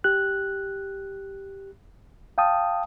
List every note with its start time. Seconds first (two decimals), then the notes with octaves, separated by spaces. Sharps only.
0.04 G4 F#6
2.38 F5 G5 A5 D#6